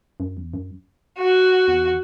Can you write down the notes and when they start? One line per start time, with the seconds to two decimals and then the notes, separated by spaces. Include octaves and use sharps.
0.20 F#2
0.37 E2
0.54 F#2
1.18 F#4
1.68 E2